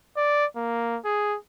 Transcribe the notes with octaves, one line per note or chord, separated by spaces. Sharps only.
D5
A#3
G#4